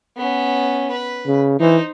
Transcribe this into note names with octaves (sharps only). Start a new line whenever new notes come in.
B3 C#4
B4
C#3
E3 D#4 C5